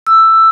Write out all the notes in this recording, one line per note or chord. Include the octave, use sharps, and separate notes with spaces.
E6